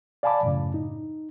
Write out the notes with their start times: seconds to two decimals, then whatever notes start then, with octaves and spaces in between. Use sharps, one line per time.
0.23 D5 F5 G#5 A5 B5 D6
0.43 F#2 A2 C#3
0.74 D#4